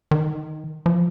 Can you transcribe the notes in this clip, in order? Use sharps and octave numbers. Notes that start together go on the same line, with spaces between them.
D#3
F3